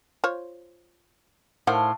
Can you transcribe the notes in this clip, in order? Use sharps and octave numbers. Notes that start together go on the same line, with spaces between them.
F4 C5 C#5
A2 D#3 C5 F5 F#5